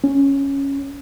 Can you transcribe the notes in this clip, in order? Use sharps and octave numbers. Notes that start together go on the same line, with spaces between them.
C#4